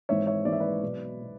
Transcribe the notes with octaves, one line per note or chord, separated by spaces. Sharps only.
G#1 G#2 E3 C#5 E5
C#5 E5
G#1 G#2 E3 D5
E5
B4 D5
B1 B2
B2